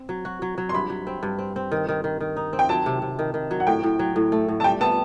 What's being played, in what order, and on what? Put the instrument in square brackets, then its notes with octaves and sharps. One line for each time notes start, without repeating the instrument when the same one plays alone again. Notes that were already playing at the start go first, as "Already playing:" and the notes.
Already playing: [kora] C4
F#3
F#4
F#3
F#3
[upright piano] C6
[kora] G2 [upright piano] B5
[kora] F#3
C4
G2
C4
C4
D#3
D#3
D#3
D#3
D#4
C4
[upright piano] G5
[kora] F#3 [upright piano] A5
[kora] C3
C3
D#3
D#3
F#3
[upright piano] F#5
[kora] A2 [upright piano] G5
[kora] A2
F#3
A2
A3
A2
[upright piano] A5
[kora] G3 [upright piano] G5
[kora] B3 [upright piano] A5